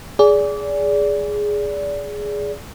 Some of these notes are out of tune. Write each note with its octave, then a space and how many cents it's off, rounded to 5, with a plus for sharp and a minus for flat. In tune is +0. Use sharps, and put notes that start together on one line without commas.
G#4 +0 D5 -25